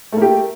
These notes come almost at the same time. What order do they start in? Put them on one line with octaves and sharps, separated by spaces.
A3 A#3 G4